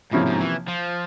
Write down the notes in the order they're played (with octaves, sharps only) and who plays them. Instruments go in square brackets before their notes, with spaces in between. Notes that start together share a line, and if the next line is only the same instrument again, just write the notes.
[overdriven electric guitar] G#2 [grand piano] C3 F3 A#3 C#4 E4
[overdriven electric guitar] G#2
E3
F3